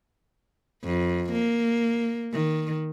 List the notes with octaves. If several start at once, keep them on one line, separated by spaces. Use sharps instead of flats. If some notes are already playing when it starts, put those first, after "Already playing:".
F2
A#3
D#3